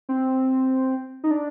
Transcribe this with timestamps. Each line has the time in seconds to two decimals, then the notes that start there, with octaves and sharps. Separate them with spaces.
0.09 C4
1.24 D#4
1.31 D4